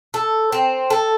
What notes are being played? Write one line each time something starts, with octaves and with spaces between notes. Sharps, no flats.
A4
C4
A4